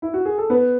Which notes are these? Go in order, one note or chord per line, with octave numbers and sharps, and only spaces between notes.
E4
F#4
G#4
A4
B3 B4